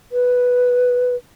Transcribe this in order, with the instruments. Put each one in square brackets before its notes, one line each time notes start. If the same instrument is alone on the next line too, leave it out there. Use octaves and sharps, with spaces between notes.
[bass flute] B4